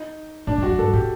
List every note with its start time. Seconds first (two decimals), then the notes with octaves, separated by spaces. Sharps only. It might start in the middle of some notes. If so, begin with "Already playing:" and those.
Already playing: D#4
0.47 A2 D4
0.58 G2
0.63 F#2 F#4
0.79 G2 A4
0.93 A2 G4